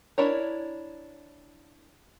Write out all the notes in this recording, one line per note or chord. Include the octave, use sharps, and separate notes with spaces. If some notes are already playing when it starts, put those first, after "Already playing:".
D4 E4 A#4 C#5